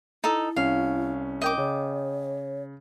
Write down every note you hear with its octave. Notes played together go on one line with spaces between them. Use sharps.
D#4 E4 A4
C2 C#4 F5
A#4 D#5 G5 D6
C#3 C#5